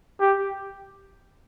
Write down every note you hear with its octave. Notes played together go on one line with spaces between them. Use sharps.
G4